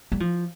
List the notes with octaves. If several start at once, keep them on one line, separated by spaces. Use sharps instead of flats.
G3
F3